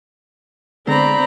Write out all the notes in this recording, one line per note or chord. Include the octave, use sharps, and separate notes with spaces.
D3 G#3 B3 C4 D5 A#5 B5